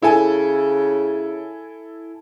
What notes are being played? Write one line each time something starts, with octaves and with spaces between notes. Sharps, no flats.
C#3 E4 A4 G#5